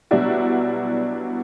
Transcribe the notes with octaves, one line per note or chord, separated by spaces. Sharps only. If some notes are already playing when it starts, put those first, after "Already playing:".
B2 F#3 G3 D4 E4 F#4